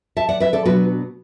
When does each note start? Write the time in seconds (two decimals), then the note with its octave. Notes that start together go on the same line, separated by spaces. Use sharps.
0.17 E5 A5
0.29 D5 F#5
0.40 B4 E5
0.53 A4 D5
0.65 B2 F#3 B3 D4 F#4 B4